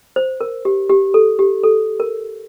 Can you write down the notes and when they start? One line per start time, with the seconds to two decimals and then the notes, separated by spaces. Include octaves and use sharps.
0.16 C5
0.41 A#4
0.65 G4
0.90 G4
1.14 A4
1.39 G4
1.64 A4
2.00 A#4